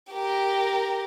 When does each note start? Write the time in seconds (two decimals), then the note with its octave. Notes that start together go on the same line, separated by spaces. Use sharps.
0.11 G4 A#4